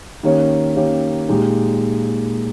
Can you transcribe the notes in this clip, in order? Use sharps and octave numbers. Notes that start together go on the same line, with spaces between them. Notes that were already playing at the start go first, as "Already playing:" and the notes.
D#3 A#3 C#4 G4 C#5
D#3 A#3 C#4 G4 C#5
A#2 G#3 D#4 G4